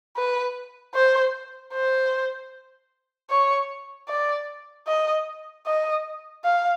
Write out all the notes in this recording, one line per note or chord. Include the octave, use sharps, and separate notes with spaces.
B4
C5
C5
C#5
D5
D#5
D#5
F5